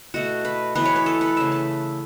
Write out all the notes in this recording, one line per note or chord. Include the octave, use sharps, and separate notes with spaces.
B2 A3 F#4
B4
E3 B3 B4
C#5
B4
A4
B4
C#3 A3 E5
A5